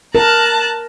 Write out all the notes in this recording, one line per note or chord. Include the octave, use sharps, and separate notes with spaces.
A#4 A5 A#5 F#6